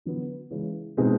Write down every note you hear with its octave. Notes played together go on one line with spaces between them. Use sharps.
D3 F#3 B3
C#3 E3 G#3 C#4
B2 G#3 C4 D#4 G#4